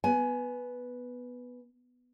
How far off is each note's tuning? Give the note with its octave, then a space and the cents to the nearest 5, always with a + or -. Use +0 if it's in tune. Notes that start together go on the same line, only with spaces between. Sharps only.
B3 +0 G#5 +15